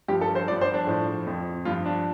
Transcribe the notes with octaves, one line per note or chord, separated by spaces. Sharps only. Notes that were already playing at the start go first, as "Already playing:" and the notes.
G2 F3 G4
A4
C5
G2 F3 D5
C5
D4
A2 F3
F2 F3
G2 F3 F4
D4